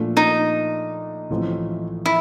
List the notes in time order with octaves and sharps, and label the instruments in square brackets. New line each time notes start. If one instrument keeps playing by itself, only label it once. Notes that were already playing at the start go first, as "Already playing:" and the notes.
Already playing: [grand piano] A#2 F3 A3 D4
[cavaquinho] D#4
[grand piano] A1 A2 F3 A3 C4
[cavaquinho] E4